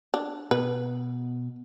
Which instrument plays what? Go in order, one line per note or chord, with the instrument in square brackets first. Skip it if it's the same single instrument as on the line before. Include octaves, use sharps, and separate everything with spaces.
[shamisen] D4
[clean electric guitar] B2 [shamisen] B4